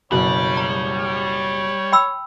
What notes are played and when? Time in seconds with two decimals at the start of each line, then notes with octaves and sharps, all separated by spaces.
0.12 F#1 B2 G3 C#5
0.57 A#5
1.92 G5 B5 E6